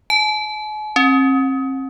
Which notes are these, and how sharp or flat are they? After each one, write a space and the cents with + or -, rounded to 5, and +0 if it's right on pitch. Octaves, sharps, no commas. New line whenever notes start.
G#5 +45
C4 +40